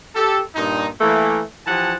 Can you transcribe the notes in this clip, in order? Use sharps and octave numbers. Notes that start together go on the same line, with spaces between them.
G4 A4
G2 A#2 D#4
E3 A3 A#3
E3 F3 G4 F#5 G#5 A5